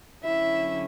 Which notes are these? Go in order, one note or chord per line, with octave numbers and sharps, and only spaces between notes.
D3 F#3 C#4 E4 E5